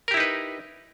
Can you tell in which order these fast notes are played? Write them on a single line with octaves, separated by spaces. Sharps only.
A#4 G4 E4 D#4 B4